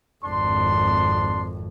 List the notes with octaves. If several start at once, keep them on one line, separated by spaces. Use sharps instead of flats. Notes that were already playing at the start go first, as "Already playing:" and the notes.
G#1 F2 D4 C6